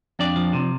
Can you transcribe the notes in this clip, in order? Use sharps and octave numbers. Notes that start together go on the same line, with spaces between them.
F2 D4 D5
F3
C3